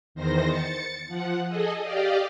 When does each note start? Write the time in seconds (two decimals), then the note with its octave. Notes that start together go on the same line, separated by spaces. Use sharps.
0.15 E2 D#3 C5 A#6
0.47 A6 C#7
1.07 F3 F#5
1.48 G#4 A4 D#5
1.82 G4 D5 D#5 F5